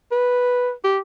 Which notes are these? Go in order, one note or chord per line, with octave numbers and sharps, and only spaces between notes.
B4
G4